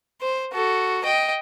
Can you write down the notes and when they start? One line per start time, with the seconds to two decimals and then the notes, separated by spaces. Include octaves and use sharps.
0.21 C5
0.54 F#4 A4
1.04 D#5 G5